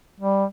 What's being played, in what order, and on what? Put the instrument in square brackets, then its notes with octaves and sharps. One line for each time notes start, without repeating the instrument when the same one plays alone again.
[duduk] G3